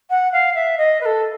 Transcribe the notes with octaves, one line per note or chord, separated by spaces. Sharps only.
F#5
F5
E5
D#5
B4
A4